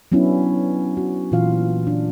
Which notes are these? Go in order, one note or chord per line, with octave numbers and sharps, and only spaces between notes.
F#3 B3 C#4 D4 E4
F#4
A#2 E3 F4 F5
D4